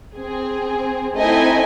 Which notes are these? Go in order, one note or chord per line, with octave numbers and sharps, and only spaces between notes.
C4 G#4
A3 C4 D#4 E4 D#5 G#5